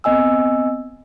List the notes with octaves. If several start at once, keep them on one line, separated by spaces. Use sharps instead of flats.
B3 C4 D#5 G#5 E6